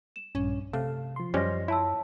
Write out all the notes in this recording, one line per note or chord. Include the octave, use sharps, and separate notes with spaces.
E7
A#1 G2 C#4
C3 A3 F5
F3 C6
F#2 G3 C#4 C5 D#5 A#6
E4 C#5 A5 E6